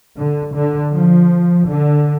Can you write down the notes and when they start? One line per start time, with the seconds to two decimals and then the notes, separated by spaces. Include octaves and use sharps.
0.19 D3
0.55 D3
0.94 F3
1.68 D3